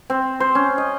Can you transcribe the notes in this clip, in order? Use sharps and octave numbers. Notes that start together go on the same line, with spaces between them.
C4
C5
C#4
D#5